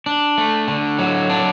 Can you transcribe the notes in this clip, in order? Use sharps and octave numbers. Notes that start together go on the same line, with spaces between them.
D4
A3
D3
F#3
D4